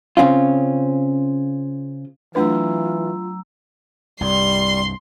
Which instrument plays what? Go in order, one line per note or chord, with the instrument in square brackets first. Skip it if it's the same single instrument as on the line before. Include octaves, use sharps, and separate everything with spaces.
[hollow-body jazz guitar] C#3 C4 C#4 F4
[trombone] E3 [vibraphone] F#3 A#5 E6 [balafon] A3 D4 B4 [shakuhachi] F4
[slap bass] C2 G2 [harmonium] G3 [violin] C6